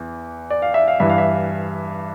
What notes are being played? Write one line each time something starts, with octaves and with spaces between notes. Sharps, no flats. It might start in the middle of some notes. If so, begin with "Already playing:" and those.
Already playing: E2 E3
D5
F5
E5
F5
G2 E3 E5
F5
E5
F5